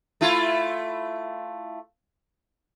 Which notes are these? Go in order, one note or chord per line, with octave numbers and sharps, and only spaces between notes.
A3 E4 F4